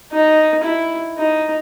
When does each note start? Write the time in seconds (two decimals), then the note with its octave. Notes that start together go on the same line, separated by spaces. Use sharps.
0.12 D#4
0.63 E4
1.17 D#4